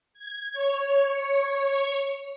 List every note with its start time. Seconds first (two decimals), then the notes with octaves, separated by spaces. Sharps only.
0.13 G#6
0.53 C#5 C#6